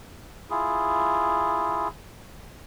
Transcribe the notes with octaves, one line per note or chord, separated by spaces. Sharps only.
E4 F4 G#4